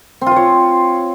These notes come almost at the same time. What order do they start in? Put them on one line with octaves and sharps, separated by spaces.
C4 F4 C5 C#5